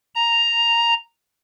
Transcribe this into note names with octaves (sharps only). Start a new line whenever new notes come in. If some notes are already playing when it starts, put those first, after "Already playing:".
A#5